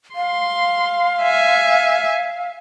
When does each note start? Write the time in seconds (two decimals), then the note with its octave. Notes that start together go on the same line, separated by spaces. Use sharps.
0.15 F5 C6
1.22 E5 G#5